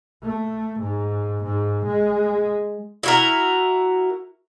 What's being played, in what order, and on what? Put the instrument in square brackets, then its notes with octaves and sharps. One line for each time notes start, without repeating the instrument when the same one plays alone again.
[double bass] A3
G#2
G#2
G#3
[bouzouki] E4 F#4 A#4